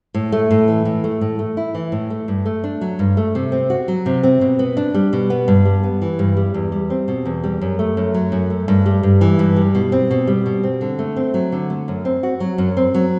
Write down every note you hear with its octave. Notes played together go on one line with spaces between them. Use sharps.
A2
A3
A2
E3
A2
A3
A2
A3
E4
E3
A2
A3
G2
A3
D4
F#3
G2
A3
C3
C4
F#4
F#3
C3
C4
B2
B3
D4
G3
B2
B3
G2
G3
B3
E3
G2
G3
E2
G3
C4
B2
E2
G3
F#2
A3
F#2
F#3
F#2
A3
G2
G3
G2
E3
G2
G3
B2
C4
B2
G3
B2
C4
D3
A3
C4
F#3
D3
A3
F#2
C4
F#4
F#3
F#2
C4
F#3